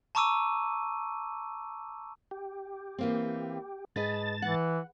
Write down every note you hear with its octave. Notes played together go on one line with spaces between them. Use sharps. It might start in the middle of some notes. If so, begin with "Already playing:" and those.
A5 A#5 C#6 D6 E6 D#7
G4
E3 A#3 C4
G#2 G#4 B4 D#5 A5 A6
E3 F#5